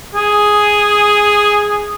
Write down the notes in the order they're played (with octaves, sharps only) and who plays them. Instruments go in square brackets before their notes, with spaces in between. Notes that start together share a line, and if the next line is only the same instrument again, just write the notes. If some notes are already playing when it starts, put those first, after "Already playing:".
[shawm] G#4